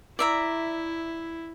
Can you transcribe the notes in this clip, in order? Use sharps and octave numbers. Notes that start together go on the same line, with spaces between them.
E4 D5 E5 A#5